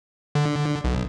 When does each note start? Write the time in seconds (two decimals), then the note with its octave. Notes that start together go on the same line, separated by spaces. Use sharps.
0.35 D3
0.84 B1